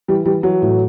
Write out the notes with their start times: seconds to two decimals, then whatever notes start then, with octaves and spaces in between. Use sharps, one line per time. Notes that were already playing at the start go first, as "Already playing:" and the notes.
0.08 E3 G3
0.26 E3 G3
0.43 E3 F#3
0.62 A2